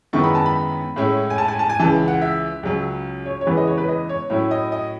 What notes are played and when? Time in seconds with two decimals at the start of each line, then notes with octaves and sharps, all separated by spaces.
0.13 F#2 D#3 G#3 B3 E4 C#6
0.24 B5
0.35 A5
0.46 B5
0.96 A2 G#3 C#4 E4
1.30 G#5
1.38 A5
1.48 G#5
1.59 A5
1.69 G#5
1.79 C#2 C#3 E3 A5
2.08 F#5
2.22 E5
2.63 C#2 C#3 F#3 C#4
3.26 C#5
3.41 C#5
3.46 E2 C#3 E3 G#3 B3 B4
3.57 D#5
3.67 C#5
3.78 B4
3.88 D#5
4.09 C#5
4.30 A2 F#3 C#4 E4 C#5
4.51 D#5
4.72 D#5